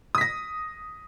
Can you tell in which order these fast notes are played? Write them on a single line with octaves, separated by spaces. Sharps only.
D#6 B6 A#6